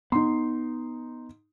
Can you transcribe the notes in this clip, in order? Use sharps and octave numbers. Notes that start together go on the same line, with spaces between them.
B3 D#4 C6